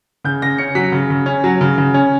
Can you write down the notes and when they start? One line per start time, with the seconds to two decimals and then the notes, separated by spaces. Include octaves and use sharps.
0.24 C#3 G6
0.42 C#3 A#6
0.58 C#4 C#7
0.75 F#3 B6
0.92 C#3
1.10 C#3
1.26 C#4
1.44 F#3
1.61 C#3
1.78 C#3
1.94 C#4